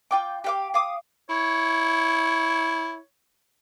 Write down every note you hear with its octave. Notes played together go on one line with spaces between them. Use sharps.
F4 G5 D6
G4 F5 D6
F5 D6 D#6
E4 C#5